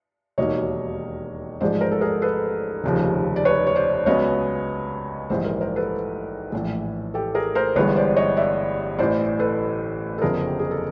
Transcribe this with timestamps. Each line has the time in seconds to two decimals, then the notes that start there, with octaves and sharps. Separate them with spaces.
0.38 E1 D#2 D#3 F#3 A#3 C#5 D#5
1.61 A1 G#2 F3 G#3 C5 D5
1.81 A#4 C5
1.91 A4
2.01 G#4 A#4
2.22 A4 B4
2.84 F1 D#2 C#3 F3
3.36 D5
3.45 B4 C#5
3.67 C#5
3.75 C5 D5
4.06 C#2 C#3 F#3 B3 C#5 D#5
5.30 A#1 G#2 E3 G3 C5 D5
5.45 A#4 C5
5.61 A#4 C5
5.76 A4 B4
6.52 A#1 A2 E3
7.14 G4 A4
7.35 G#4 A#4
7.55 A#4 C5
7.76 G1 G2 E3 G#3 B4 C#5
7.96 C5 D5
8.16 C#5 D#5
8.37 D5 E5
8.98 A1 A2 E3 C5 D5
9.39 A4 B4
10.18 A4
10.22 F#1 F2 D3 F3 A3 G#4 A#4
10.47 G4
10.59 G#4
10.71 A4